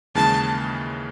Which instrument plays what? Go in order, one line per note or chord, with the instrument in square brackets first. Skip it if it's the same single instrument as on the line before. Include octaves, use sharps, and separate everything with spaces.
[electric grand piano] D#2 C#3 E3 G#3 [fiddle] A5